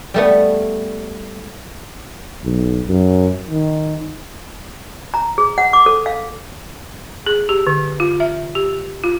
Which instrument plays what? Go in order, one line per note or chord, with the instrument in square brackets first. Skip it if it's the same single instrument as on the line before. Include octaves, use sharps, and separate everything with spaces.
[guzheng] G3 A3 B3
[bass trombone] B1
F#2
D#3
[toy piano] A#5
G#4
F#5
D6
A4
F5
[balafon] G#4
G4
D3
F4
E5
G4
F4